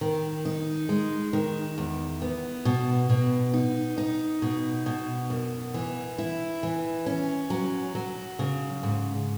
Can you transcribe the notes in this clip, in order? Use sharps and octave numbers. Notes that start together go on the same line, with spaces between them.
D#3
D#4
G#3
D#3
E2
B3
B2
B2
D#4
D#4
B2
B2
F#2
E3
E4
E3
C#4
F#3
F#3
C#3
G#2